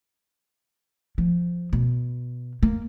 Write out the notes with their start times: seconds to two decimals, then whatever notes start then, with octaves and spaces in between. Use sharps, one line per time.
1.18 F3
1.73 B2
2.63 A#3